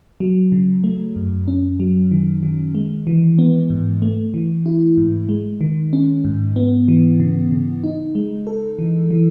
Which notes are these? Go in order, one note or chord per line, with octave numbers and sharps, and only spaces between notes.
F#3
C#3
A3
F#2
C#4
F#3
D#3
D#3
G#3
E3
B3
G#2
A3
E3
E4
G#2
G#3
D#3
C#4
G#2
B3
E3
C#3
C#3
D#4
G#3
A4
E3
E3